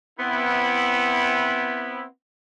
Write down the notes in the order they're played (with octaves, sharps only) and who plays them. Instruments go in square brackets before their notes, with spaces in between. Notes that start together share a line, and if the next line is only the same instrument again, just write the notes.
[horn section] B3 C4 E4